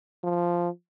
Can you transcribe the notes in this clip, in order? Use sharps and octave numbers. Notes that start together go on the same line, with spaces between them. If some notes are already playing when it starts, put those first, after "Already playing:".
F3